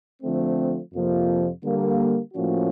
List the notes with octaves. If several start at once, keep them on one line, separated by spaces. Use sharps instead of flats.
D3 F3 A3 C4
F2 C3 F3 A#3
D3 G3 A#3
A2 F3 A#3 C#4 F#4